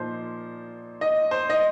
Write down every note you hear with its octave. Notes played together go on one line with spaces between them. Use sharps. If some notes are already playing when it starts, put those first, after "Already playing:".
Already playing: A#2 F3 D#4 C5
D#5
C5
D#5